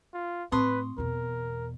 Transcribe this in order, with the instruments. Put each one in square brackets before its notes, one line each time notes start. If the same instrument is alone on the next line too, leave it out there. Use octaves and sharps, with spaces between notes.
[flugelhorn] F4
[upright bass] A2 [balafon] C4 [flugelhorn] B4 [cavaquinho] C6 C#6 D#6
[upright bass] E2 B2 [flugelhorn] A#4